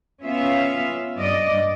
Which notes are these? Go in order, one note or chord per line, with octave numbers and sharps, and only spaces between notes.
B3 C#4 F4 E5 F5
G2 D5 D#5